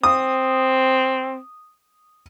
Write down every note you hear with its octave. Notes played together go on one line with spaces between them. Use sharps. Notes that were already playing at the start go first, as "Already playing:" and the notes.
C4 D#6